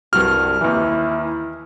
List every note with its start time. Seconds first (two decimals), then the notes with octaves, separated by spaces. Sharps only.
0.13 C2 G2 F#4 F6
0.61 D#2 E3 E4